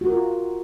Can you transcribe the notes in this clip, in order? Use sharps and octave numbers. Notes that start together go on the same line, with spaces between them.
F#4
A#4
F4